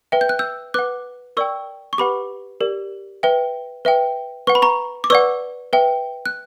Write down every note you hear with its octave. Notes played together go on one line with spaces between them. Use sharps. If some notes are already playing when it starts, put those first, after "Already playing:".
B4 E5 G5
G6
F#6
E6 G6
B4 F#5 D6 F#6
A#4 D5 G5 C#6 E6
C#6
G4 B4 F#5 B5 D6
G4 A#4 D5
B4 E5 G5
B4 E5 G5
B4 F#5 C#6
B5
A#5 C#6
D6
B4 D5 F#5 C#6 E6
B4 E5 G5
F#6